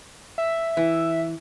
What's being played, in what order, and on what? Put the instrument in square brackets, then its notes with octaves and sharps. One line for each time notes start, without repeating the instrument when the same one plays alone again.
[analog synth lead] E5
[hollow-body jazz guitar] E3